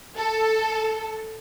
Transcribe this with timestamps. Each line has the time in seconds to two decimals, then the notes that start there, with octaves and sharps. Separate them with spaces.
0.17 A4